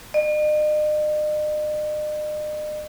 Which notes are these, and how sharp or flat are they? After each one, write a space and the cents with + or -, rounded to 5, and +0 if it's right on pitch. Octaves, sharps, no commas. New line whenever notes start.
D#5 -45